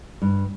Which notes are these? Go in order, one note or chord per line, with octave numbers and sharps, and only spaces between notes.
G2